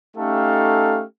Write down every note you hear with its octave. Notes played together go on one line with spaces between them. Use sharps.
A3 C#4 D#4 G4 A4 F5